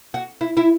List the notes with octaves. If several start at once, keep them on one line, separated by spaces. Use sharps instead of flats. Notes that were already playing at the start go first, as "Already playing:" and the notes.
F#4
E4
E4